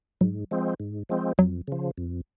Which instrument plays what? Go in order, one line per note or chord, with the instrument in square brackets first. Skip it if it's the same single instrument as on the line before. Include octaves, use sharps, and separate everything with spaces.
[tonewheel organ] G#2 [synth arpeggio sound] F#3
[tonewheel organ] F3 G#3 C4
G#2
F3 G#3 C4
[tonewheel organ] F2 [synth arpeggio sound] F#3
[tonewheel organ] C#3 F3
F2